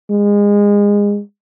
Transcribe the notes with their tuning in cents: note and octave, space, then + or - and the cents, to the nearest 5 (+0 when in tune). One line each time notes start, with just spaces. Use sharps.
G#3 -25